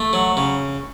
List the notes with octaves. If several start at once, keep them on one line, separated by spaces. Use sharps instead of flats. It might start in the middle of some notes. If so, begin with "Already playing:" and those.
Already playing: A3
F#3
C#3